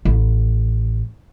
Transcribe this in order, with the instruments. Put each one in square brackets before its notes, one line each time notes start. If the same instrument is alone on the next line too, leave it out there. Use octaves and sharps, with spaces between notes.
[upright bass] A1